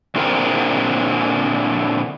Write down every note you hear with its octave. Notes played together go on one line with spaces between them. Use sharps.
A#2 D3 C4 E4 G#4 A#4